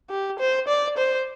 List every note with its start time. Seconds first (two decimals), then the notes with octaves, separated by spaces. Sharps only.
0.10 G4
0.39 C5
0.68 D5
0.97 C5